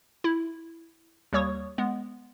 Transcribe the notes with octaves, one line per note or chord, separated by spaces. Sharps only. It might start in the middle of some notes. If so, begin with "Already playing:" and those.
E4
D#2 G3 C#5 C#6 D#6
G#3 B3